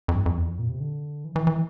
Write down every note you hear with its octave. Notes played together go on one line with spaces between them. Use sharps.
F2
G2
F2
E2
F2
A#2
C3
D3
E3
E3
E3